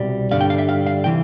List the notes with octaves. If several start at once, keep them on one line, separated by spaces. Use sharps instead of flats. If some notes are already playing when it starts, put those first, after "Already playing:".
Already playing: C2 B2 G3
G2 D3 G3 F5
G5
F5
E5
F5
F5
C3 E3 G5